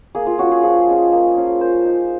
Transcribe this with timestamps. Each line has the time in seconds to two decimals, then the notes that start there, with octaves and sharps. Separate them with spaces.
0.15 A#3 G#4
0.27 F4
0.38 C#4 F4 F#4
0.51 G#4
0.63 F3 G#4
0.87 G#3 C#4 F4
1.12 A#3
1.37 C#4 F4
1.60 A#3 C5
1.85 D#4